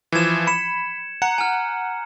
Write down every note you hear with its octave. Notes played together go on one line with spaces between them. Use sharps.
E3 F3 G#6 E7
B5 C#7 E7
F#5 A#5 C#7
G#5 F6